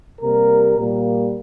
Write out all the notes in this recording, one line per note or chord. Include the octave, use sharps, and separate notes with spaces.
C3 G3 A#3 A#4
A#2 G3 A#3